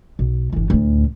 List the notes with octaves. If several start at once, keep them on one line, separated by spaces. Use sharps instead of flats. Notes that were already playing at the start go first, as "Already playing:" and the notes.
B1
G1 E3
D2 A2